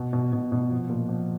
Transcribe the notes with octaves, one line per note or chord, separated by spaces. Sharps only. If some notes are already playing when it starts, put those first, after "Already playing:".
Already playing: B2
B2
B2
B2
F3
A#2
F3